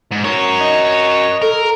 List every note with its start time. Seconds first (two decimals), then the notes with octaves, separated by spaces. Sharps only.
0.12 G#2
0.25 F#4 A#4 C#5
0.60 D#5
1.42 A4 A#4